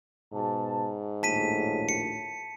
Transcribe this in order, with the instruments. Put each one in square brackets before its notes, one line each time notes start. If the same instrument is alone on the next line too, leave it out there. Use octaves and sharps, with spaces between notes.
[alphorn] G#2 [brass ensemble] B2 A5
[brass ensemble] A#1 D#2 A2 [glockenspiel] A5 B6 D#7
[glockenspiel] C#7